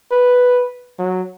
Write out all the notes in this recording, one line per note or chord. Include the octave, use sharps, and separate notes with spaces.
B4
F#3